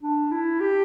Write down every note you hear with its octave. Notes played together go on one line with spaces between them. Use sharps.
D4
E4
G4